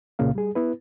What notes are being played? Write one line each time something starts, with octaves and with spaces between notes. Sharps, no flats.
C2 A#2 C#3 A#3 F5
G3 G#4
B3 E4 B4